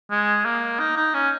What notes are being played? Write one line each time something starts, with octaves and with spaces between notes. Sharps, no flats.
G#3
A#3
D#4
D#4
C#4